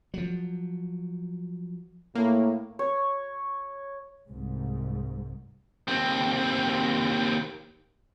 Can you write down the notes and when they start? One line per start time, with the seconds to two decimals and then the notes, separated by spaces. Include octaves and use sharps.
0.14 F3 F#3
2.15 A2 A#3
2.79 C#5
4.28 C2 G#2
5.88 D#2 C4